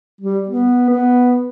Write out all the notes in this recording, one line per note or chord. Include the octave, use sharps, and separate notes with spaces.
G3
B3
B3